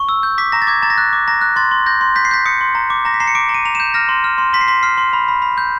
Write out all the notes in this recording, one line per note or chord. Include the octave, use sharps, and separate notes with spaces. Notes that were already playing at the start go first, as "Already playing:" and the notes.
Already playing: C#6
E6
G6
D6 B6
A#5 A#6
A6
D6 G#6
A#5 A6
A#6
F#6 A6
D6
A#5 A#6
F#6
C6 A6
C6
G6 A#6
C6
G6 B6
C7
G6 B6
D#6 C#7
C6
A#5
D6
A#5 A#6
B6
A#5 C7
C#7
D6 D7
A#5
D#7
A#5 F7
G6 E7
F6 A#6
C6
F6
C6
C6 B6
C7
C6 B6
F6 C7
C6
B5
B5
B5
G6